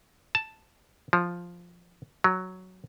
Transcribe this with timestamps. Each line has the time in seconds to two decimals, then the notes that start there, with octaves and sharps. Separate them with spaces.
0.35 A5
1.13 F3
2.24 F#3